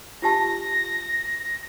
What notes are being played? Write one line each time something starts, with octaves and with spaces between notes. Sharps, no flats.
F4 G4 A5 A#6